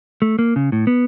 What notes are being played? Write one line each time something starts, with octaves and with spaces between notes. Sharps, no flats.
A3
A#3
C#3
A2
B3